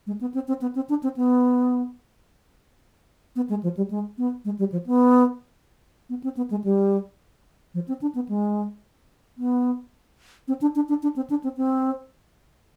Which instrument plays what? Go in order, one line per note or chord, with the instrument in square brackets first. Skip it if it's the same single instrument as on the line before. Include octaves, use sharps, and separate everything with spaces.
[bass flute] G#3
B3
C4
C4
B3
C4
D4
C4
B3
B3
G#3
F3
G3
G#3
B3
G#3
G3
F3
B3
B3
C4
B3
G#3
G3
F3
C4
D4
B3
G#3
B3
C4
D4
D4
D4
D4
C4
D4
C4
C4